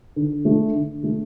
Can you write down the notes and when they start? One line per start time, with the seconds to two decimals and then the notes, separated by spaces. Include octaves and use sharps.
0.16 D3
0.45 A3 D4
0.75 D3
1.03 A3 D4